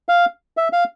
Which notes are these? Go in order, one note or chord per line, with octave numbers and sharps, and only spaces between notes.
F5
E5
F5